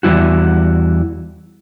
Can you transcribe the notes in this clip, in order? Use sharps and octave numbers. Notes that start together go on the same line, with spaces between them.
E2 C3 G3 E4 F#4